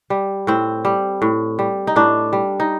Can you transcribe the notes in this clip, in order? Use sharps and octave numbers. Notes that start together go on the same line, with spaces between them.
G3
A2 C4
G3
A2
G3
D#4
A2 D4
G3
D#4